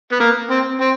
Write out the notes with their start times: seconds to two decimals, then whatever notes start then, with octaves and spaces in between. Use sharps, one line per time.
0.12 B3
0.20 A#3
0.51 C4
0.80 C4